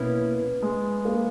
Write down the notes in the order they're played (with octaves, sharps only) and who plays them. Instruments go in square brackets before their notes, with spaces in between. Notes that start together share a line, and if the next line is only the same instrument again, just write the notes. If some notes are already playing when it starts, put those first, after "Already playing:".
Already playing: [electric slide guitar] B2 A#3 C#4 E4 [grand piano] B3
[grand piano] G#3
A#3